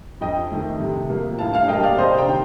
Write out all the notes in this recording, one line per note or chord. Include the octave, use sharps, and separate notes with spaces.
F2 D#5 G5
D#3 A3
C3
F3 A#3
A2 F5 A5
F5 A5
F5
G3 A#3 D#5 G5
D5 F5
C3 C5 D#5
G5 A#5
D#3